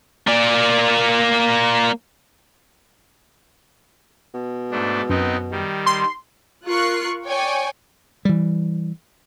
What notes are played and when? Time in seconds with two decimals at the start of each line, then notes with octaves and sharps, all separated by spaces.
0.27 A#3 D5
4.34 B2
4.71 G#2 A3 D4
5.09 F#2 B3 C4 D#4
5.51 D#3 G3
5.86 C6
6.67 F4 A#4 C#6 F#6 C7
7.27 C#5 D5 G5 G#5 C#6
8.25 E3 G3